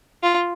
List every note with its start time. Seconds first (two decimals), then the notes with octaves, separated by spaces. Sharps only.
0.23 F4